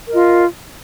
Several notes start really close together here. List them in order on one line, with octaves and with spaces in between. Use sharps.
A#4 D#5 F4